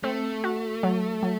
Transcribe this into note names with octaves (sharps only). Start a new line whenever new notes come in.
A3 C4
F#4
F#3
F#3